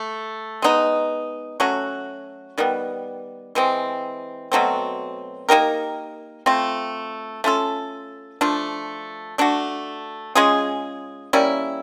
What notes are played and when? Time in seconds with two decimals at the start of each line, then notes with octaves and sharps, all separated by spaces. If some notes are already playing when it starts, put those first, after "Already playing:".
Already playing: A3
0.62 G#3 B3 D#4
1.60 F#3 A3 C#4 F#4
2.58 D#3 G3 B3
3.55 E3 G#3 C4
4.52 B2 F#3 A3 C4
5.49 A#3 D#4 G4 A#4
6.46 A3 C4 F4
7.44 A3 C#4 F4 A4
8.41 F3 A3 D4 F4
9.38 A3 D4 F#4
10.35 G#3 C#4 F4 G#4
11.33 G3 A#3 C#4 E4